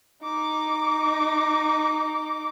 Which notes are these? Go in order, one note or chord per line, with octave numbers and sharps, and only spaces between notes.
D#4 D6